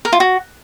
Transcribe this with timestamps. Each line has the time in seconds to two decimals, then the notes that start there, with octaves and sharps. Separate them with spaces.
0.05 A#4
0.13 F4
0.20 F#4